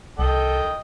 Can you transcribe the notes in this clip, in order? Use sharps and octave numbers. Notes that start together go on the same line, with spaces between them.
C2 A4 D#5 G5